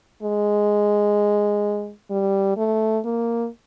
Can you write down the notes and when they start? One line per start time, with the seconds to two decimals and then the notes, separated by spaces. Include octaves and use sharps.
0.23 G#3
2.11 G3
2.57 A3
3.05 A#3